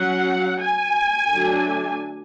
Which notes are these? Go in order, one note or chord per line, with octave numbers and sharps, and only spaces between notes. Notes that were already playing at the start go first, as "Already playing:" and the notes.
Already playing: F#3 C#4 F#5
G#5
D3 F#3 A3 D4